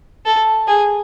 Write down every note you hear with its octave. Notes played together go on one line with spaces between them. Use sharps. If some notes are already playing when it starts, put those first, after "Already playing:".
A4
G#4